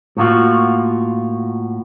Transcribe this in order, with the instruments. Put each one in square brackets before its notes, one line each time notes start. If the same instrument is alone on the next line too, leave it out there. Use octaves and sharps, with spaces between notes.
[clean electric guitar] A2 A#3 F4 F#4